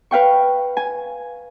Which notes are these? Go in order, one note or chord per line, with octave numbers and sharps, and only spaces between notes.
B4 F5 G5 C#6
G#5